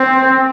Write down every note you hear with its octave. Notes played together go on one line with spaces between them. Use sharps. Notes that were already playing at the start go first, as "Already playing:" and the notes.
Already playing: C4